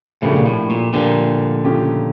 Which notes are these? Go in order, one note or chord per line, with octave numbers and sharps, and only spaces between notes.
A2 C#3 F3 A3 D4 G4 A#4
A#2
A2
A#2
A#2 D3 F3 A3 D4 G4 A#4
C#3 F3 A3 C#4 G4